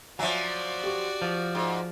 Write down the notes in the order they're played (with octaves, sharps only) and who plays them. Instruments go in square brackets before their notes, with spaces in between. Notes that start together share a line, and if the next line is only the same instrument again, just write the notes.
[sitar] F3 F#3 [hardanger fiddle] F#4 D5 [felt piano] E5 G#5
[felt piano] G4 C#6
[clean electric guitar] F3
[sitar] G#2